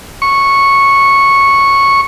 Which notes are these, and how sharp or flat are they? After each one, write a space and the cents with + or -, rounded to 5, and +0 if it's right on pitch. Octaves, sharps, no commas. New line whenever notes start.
C#6 -10